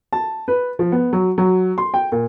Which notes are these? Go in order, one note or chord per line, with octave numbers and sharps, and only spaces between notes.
A5
B4
F3
B3
F#3
F#3
C6
G5
A#2